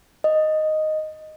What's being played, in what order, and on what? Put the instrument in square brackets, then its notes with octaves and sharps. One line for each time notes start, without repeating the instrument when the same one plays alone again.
[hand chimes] D#5